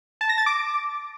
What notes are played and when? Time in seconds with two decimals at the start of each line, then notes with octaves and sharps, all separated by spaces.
0.21 A5
0.29 A#6
0.38 A6
0.46 D6